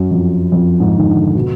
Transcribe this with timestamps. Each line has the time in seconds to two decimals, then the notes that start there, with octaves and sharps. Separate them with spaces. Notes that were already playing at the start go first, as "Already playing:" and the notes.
Already playing: F#2
0.11 F2
0.52 F2
0.80 G#2
0.97 D#3
1.07 D3
1.35 B2